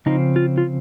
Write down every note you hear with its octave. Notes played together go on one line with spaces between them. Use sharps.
C#3 F3 C4 D#4
F4
F4